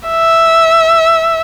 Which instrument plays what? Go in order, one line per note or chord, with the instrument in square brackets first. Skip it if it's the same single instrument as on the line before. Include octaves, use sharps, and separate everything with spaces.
[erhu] E5